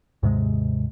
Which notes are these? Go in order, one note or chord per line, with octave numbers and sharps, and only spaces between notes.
D#2 G#2 C3 G#3